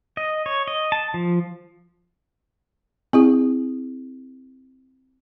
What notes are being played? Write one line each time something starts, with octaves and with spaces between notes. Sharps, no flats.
D#5
C#5
D#5
A5
F3
C4 E4 G#4